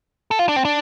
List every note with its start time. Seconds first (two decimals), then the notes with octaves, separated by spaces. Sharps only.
0.31 A4
0.39 F4
0.49 D4
0.56 C4
0.65 D4